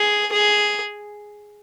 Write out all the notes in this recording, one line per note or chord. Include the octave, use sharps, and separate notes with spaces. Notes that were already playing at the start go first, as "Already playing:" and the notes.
Already playing: G#4
G#4